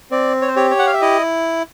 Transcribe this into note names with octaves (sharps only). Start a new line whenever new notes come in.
C4 D5
C#5
C5
G4 C#5
C#5
F#5
F5
E5
E4 D#5